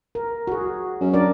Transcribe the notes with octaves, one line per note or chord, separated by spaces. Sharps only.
A#4
F#4 G#4
F#2
D4 A#4 D5